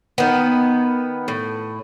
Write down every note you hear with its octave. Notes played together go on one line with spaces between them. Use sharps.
D#3 B3
A2